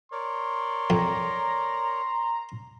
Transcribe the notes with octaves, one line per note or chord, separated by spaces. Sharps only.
A#4 C#5 D5 C6
F2 A#5